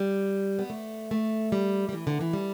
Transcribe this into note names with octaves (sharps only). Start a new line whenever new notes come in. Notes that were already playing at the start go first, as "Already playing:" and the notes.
Already playing: G3
B3
A3
A3
G3
G3
E3
D3
E3
G3